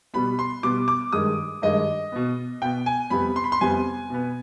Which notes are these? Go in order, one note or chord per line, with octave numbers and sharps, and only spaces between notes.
B2 G3 B3 B5
C6
B2 G3 B3 D6
D6
G2 D#3 G#3 D#6
G2 D#3 G#3 D#5
B2 B3
B2 B3 G5
G#5
F2 C3 G3 B3 B5
C6
B5
C6
F2 C3 G3 B3 G#5
B2 B3